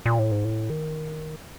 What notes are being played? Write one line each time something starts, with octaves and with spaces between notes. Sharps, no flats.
A#2
A2
G#2
A2
D#3